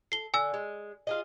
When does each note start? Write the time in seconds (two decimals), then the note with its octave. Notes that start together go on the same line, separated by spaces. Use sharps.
0.12 A4 C7 G7
0.34 D3 G#5 E6
0.54 G#3
1.07 F4 G#4 D#5